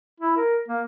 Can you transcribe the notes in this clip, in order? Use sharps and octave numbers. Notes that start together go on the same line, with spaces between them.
E4
A#4
A#3